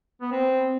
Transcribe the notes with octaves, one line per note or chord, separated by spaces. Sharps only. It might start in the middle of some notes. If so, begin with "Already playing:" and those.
B3
C4